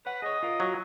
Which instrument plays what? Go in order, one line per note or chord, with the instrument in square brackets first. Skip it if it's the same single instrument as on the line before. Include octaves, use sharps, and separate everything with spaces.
[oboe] B4 [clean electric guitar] C#5 F#5
[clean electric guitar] G#4 C#5 [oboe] D#5
[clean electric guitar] F4 A#4
[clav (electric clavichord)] F#3